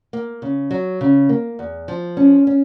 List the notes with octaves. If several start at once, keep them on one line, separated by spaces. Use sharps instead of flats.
A#3
C#3
F#3
C#3
A#3
E2
F3
C#4
C#4